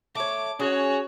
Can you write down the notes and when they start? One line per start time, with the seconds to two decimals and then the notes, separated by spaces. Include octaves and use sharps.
0.15 A3 C#5 D6
0.60 C#4 F#4 G#4 C#5